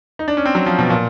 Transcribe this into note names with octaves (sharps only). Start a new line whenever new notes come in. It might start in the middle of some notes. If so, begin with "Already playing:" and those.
D#4
D4
C#4
C4
F#3
F3
B2
A#2